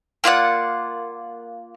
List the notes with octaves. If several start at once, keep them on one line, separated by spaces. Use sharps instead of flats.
A#3 F4 D5 F#5